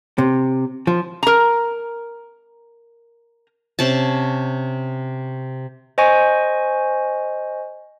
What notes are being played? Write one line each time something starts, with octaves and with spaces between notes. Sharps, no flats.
C3
F3
A#4 A#5
C3 C#4 A5
C5 D#5 G#5 C#6